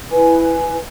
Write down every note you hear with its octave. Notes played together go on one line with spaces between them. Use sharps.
E4 B4 G#5